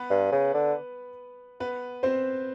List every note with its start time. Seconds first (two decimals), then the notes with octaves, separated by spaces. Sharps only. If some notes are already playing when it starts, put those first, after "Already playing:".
Already playing: B3 B4
0.10 G2
0.32 C#3
0.54 D3
1.60 B3 B4
2.03 C4 C5